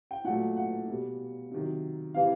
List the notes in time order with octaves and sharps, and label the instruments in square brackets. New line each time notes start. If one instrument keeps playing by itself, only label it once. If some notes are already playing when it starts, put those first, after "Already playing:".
[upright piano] G5
A#2 F#3 A3 F#5
F#5
B2 G3
C3 D#3 F#3
C3 E3 G3 F5